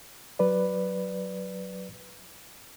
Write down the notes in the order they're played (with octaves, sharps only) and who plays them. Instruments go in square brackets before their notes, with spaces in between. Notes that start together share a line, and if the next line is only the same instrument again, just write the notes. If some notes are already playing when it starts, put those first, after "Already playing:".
[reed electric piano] F#3 B4 D5